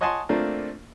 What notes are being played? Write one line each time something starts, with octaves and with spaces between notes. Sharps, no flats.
C#5 D#5 F#5 G#5 A5 C6
A3 A#3 C4 D4 F4